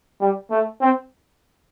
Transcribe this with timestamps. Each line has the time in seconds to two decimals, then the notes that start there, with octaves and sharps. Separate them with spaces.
0.21 G3
0.51 A3
0.81 C4